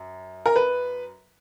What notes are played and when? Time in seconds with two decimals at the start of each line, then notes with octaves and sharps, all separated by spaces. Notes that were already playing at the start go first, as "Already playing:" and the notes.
Already playing: F#2
0.46 A#4
0.56 B4